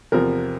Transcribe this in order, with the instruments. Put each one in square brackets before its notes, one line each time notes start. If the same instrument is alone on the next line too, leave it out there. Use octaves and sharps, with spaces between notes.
[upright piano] E2 C3 F3 A#4